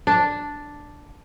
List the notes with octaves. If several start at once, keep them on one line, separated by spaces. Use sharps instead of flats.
D4